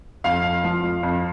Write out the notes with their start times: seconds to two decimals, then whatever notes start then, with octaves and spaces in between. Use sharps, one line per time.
0.24 F2 F5
0.44 F2
0.64 F3
0.83 F2
1.03 F2